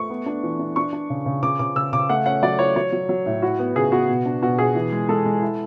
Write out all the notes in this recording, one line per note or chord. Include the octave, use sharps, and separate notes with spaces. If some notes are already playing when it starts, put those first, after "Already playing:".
Already playing: A3 C#6
B3
D4
E3
D4
D4 C#6
D4
C#3
C#3
C#3 D6
C#3 D6
C#3 E6
C#3 D6
A3 F#5
C#4 F#5
F#3 D5
E4 C#5
F#3 C#5
F#3
F#3
A2
E4 F#4
B3
C#3 G#4
B3 F#4
B2
D4
B2 F#4
B2 G#4
E3
G#3
G#3 A4
G#3
E4